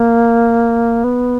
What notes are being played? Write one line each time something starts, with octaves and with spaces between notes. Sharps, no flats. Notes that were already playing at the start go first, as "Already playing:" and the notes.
Already playing: A#3
B3